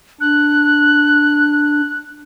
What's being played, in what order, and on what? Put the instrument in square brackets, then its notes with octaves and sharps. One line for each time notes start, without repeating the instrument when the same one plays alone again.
[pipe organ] D4 [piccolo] F#6